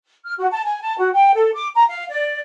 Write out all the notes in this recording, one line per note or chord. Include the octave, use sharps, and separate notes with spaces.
F6
F#4
A5
G#5
A5
F#4
G5
A4
D6
A#5
F5
D5